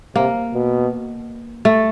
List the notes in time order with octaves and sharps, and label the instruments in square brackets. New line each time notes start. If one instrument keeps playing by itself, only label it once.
[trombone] C3 [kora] A#3
[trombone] B2
[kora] A3